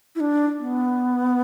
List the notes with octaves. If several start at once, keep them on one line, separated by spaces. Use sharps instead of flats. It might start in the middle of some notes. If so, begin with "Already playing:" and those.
E4
D4
B3